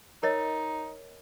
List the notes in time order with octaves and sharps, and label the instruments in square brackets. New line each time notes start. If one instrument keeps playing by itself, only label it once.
[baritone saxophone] D#4 [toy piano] A#4 C#5 D#5